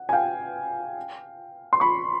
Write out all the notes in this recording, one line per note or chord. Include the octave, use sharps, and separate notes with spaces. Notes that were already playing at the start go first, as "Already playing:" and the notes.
Already playing: F#5
G#5
F5 G5
C6
B5 C#6